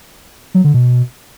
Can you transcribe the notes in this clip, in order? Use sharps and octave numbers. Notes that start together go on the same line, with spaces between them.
F#3
D3
B2